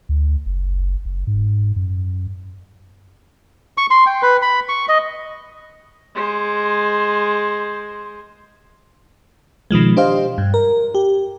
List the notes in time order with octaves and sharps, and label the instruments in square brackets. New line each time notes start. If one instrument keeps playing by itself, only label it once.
[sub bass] D2
F#1
F#1
G#2
F#2
[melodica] C#6
C6
G5
B4
B5
C#6
D#5
[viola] G#3 C5
[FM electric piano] B2 D#3 F3 G#3
D4 G4 C5 D#5 F5
G2
A#4
G4